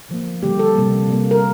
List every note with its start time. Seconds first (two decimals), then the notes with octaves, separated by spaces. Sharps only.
0.09 D3 F3 A#3
0.43 D3 G3 A#3 G4
0.59 A4
0.75 C3 G3 A#3
1.08 C3 G3 A#3
1.31 A#4